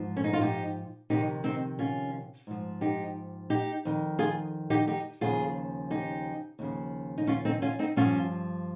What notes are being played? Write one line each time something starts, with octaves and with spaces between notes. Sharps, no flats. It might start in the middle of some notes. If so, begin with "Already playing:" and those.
Already playing: G#2 F3
C#4
D#4
F4
D#4 G4
F2 C3 D#3 D#4 G4
C4 D#4
C#4 F4
G#2 F3
D#4 G4
D#4 G4
F2 D#3
F4 G#4
D#4 G4
D#4 G4
D#2 C#3 F3 F4 G#4
D#4 G4
D#2 C#3 F3
D#4
C#4 F4
C4 D#4
C#4 F4
C4 D#4
G2 F3 C#4 F4